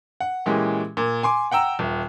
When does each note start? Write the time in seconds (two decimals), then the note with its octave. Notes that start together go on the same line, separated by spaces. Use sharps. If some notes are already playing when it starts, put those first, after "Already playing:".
0.20 F#5
0.46 A#2 E3 G#3 C#4 G4
0.97 A#2
1.23 G#5 C6 D6
1.51 F#5 G5 A#5 E6 E7
1.79 D#1